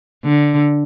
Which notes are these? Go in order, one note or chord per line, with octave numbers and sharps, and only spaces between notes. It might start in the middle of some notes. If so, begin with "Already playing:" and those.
D3